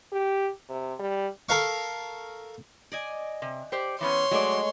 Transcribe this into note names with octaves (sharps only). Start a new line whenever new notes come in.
G4
C3
G3
A4 A#4 F5 C#6
D5 D#5 G#5
C3
G4 C5 D5 C#6
E3 B3 C#4 C#5 C6
F#3 G#3 A3 D5 C#6